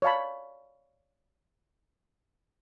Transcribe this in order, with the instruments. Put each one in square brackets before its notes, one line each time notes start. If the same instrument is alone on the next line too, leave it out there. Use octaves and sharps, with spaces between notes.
[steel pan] C#5 D5 F5 A5 B5